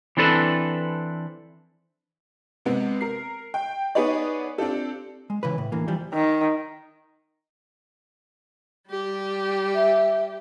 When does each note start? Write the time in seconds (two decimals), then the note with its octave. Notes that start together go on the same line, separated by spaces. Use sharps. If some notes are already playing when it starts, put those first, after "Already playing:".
0.17 E3 C4 D4 A4 B4
2.66 C3 G#3 B3 C4
3.01 A#4 C7
3.54 G5
3.95 B3 D#4 G#4 B4 C#5 D5
4.58 C4 D4 F4 G4 A4
5.30 G#3
5.43 C#3 E3 B4
5.58 A2
5.72 D2 D3 E3 A#3
5.88 E3 F3 G3
6.14 D#3
8.90 G3 G4
9.75 E5